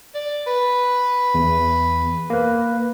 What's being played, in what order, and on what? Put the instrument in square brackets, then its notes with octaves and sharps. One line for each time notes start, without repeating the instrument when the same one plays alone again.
[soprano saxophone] D5
B4
[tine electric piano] E2
A#3 B4